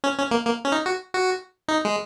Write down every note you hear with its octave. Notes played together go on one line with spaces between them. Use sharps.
C#4
C#4
A#3
A#3
C#4
D#4
F#4
F#4
D#4
G#3